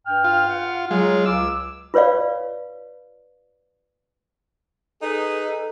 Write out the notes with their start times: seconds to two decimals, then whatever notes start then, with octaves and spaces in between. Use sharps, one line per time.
0.05 G2 G5 F6
0.24 F4
0.48 F5 F#5
0.91 F#3 G#3 F4
1.26 C#2 D6 E6
1.94 F4 B4 C#5 D5 F5
5.02 D#4 G#4 A4 B4